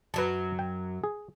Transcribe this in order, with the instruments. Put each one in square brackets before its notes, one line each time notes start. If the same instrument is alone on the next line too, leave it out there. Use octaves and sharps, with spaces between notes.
[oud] F#2 F#3 [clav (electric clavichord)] B4 A5
[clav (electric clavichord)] G5
G#4